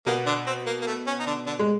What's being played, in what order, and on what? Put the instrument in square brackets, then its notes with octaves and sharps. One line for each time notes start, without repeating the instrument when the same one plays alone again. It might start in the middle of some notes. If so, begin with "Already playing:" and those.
[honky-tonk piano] B2 B3 [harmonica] A#3
[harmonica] D3 D4
C4
A#3
A#3
A3
C#4
D#4
D3 D4
D3 D4
[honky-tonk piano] G#3